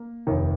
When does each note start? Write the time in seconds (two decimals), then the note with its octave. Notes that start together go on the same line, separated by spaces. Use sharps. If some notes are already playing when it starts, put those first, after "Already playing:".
Already playing: A#3
0.27 F1 D#2 D#3